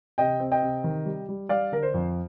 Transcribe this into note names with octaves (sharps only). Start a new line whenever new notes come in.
C3 D#5 G5
C4
D#5 G5
C3
D#3
G3
G3
G3 D5 F5
D3 A#4
C5
F2